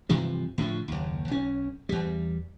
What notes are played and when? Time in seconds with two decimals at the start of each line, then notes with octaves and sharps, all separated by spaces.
0.09 G2 C3 E3 F3
0.58 A2 D3 E3 F3
0.88 F#1 D#2
1.28 B1 C#4
1.89 E2 G3